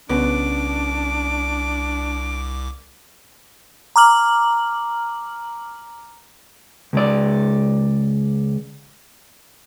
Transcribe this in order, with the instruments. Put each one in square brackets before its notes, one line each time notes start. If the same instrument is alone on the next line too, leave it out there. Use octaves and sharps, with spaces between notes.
[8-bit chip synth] C2 D6 [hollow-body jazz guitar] C#3 B3 [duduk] D4 [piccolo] D7
[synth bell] A#5 D6 F6 F#7
[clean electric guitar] C#2 D5